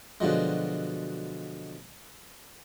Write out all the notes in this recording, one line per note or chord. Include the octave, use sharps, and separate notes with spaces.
B2 D3 F3 F#3 G#3